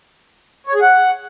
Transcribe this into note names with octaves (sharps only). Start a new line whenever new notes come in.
C#5
G#4
F#5